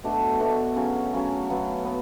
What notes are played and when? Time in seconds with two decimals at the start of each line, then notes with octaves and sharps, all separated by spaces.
0.04 B2 A3 D4 F#4
0.40 B2 A3 D4 F#4
0.76 C#3 F#3 C#4
1.13 C#3 F#3 C#4
1.49 C#3 F#3 B3
1.85 B3